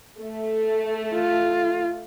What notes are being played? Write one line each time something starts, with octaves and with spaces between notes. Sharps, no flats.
A3
F4